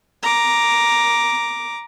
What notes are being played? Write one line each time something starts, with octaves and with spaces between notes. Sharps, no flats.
A#5 D6